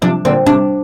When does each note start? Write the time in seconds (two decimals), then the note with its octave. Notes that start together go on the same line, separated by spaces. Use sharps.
0.02 C3 F3 D4
0.25 A#2 D3 C4
0.46 C3 D4